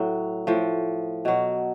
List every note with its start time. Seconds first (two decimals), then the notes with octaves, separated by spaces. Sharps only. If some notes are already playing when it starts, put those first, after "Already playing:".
Already playing: A2 F#3
0.47 A2 F3
1.25 B2 F#3